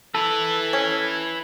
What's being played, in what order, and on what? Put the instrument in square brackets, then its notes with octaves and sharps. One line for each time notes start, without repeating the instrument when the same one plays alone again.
[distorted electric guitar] E4 B4 [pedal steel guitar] A4
[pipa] C#4